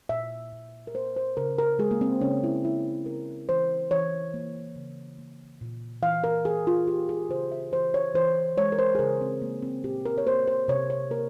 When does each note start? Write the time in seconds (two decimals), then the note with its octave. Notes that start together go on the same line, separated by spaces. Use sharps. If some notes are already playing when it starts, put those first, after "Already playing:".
0.09 A#2 E5
0.52 A#2
0.87 A#4
0.94 A#3 C5
1.16 C5
1.37 C#3 A#4
1.58 A#4
1.79 G#3 G#4
1.91 A#3
2.01 C4
2.21 C#3 C#4
2.44 E4
2.64 G#3 E4
3.06 C#3 A#4
3.49 E3 C5
3.91 E3 C#5
4.34 A#3
4.76 C#3
5.19 A#3
5.61 A#2
6.02 E3 F5
6.24 A#4
6.45 E3 G#4
6.67 F4
6.87 A#3 G4
7.09 G#4
7.29 C#3 C5
7.52 E5
7.72 E3 C5
7.94 C#5
8.14 E3 C5
8.57 G#3 C#5
8.72 A#4
8.79 C5
8.95 G#4
8.99 C#3 A#4
9.21 C4
9.42 G#3 A#3
9.62 C4
9.84 A#2 G4
10.05 A#4
10.18 C#5
10.26 A#3 C5
10.48 C5
10.68 C3 C#5
10.90 C#5
11.11 A#3 A#4